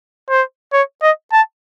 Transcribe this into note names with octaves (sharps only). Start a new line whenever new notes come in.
C5
C#5
D#5
A5